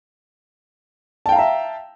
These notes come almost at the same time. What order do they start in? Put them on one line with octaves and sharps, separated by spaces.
A5 G5 F5 A#5 E5